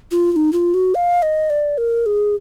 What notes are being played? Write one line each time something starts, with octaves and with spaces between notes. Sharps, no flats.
F4
F4
D#4
F4
F#4
F5
D#5
D5
A#4
G#4